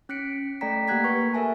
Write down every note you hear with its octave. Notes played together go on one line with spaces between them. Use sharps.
C#4 F#6 B6 C#7 D7
A3 A4 D5 G5 A#5 B6
A#3 G4 F#5 F#6 G#6 B6
B4 C#6
A4 A#4 E5 G#5 A5